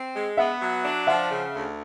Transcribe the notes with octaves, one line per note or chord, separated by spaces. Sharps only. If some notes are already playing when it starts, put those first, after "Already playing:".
Already playing: C4
G#3
B3 E5 F#5
F#3
D4
F3 E5 F#5
C#3
D2